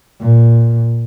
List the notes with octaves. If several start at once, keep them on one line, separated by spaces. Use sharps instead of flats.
A#2